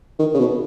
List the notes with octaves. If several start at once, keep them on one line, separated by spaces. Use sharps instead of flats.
D#3
C#3
B2